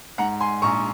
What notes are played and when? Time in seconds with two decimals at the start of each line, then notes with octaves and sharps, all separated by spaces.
0.18 G#2 F#5 A#5
0.40 G#5 C6
0.62 A#1 A#5 C#6